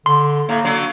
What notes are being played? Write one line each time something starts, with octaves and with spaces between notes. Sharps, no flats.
D3 C6
A2 A#3
D3 F#3